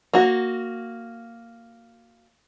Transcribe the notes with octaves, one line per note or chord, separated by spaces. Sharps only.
A#3 F#4